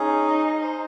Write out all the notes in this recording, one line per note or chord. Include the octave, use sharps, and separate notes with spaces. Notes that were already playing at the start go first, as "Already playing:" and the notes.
Already playing: C#4 D#4 G#4
D#5
C5